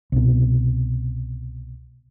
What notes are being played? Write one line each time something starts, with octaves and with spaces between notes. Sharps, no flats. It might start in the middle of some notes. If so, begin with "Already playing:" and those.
C2 B2